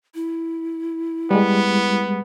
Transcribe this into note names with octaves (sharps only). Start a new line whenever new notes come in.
E4
G3 G#3 B3